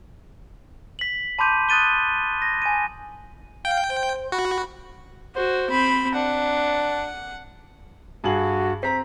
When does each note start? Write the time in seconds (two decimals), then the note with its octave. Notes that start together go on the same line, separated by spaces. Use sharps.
0.99 B6 F#7
1.39 A5 B5 C6 D6 G6 D#7
1.69 D#6 F#6 A6 D#7 G7
2.42 A#6
2.62 G#5 D#7
3.65 F5 G5
3.89 C5
4.32 F#4 B5
5.36 F#4 C5
5.70 C4 B5
6.15 D4 F#5
8.24 G2 F#4 G#4 F#7
8.83 C4 A#5 B6